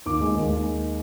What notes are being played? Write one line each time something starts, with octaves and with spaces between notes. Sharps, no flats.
D#2 D6
G#3
D#2
G#3